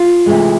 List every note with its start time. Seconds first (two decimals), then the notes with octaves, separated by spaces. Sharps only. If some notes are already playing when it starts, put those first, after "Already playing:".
Already playing: F4
0.26 D2 C3 E3 G#3